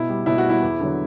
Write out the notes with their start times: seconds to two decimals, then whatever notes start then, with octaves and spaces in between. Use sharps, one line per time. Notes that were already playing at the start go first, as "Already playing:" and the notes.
Already playing: B2 E4
0.09 G3
0.26 B2 E4
0.38 F#4
0.44 G3
0.50 E4
0.62 E2
0.80 D3 F#3